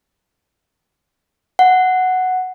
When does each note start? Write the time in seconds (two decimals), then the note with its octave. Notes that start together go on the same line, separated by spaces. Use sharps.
1.59 F#5